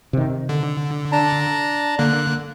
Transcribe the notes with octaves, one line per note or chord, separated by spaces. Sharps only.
C3 D#3
D3
D4 A5 A#5
D3 A#3 F#6